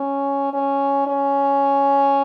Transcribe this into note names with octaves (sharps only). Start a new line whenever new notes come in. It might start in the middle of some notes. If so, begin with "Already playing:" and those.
Already playing: C#4
C#4
C#4